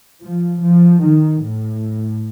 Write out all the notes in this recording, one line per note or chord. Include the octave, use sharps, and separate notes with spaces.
F3
F3
D#3
A2